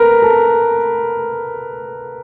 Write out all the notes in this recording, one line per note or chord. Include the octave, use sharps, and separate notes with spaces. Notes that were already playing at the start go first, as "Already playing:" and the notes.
Already playing: A#4 B4
A4